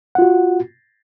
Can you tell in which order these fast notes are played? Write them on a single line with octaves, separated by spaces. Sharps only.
F#5 F4 F#4